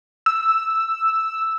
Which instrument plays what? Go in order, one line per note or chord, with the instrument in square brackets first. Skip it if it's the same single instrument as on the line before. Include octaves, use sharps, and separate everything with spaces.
[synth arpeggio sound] E6